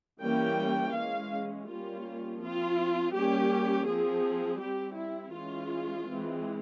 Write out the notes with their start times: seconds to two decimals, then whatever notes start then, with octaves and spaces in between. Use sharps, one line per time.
0.22 E3 G3 A#3 C#4 G5
0.95 E3 G#3 C#4 F5
1.68 G3 A#3 C#4 F4
2.41 F3 C4 F4
3.15 G3 A#3 C#4 G4
3.87 F3 C4 G#4
4.60 G3 C4 G4
4.97 E4
5.33 E3 G#3 C#4 F4
6.07 E3 G#3 C4